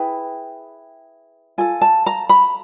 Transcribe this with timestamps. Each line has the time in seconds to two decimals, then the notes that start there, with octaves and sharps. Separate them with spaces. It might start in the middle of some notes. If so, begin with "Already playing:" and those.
Already playing: E4 G#4 B4 G5
1.58 F4 A4 G#5
1.81 A5
2.06 A#5
2.29 B5